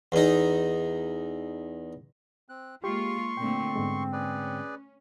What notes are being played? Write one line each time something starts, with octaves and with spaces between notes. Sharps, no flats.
E2 D#4
C4 F#6
G#3 A#3 F4 G4 C6 C#6
A#2 D3 A3 C4 G5
G#2 D3 G#3 B3
C#4 G#4 B4 D5